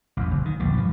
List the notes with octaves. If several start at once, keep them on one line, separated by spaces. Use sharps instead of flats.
A1 E2
F#1
D#3
E1 A#1 D3
G2 F3